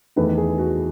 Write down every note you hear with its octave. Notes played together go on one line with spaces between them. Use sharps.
E2 D#3 A3 B4
G#4
F#4